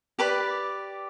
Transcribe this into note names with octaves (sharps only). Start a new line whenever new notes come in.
G4 B4 D5 B5 D6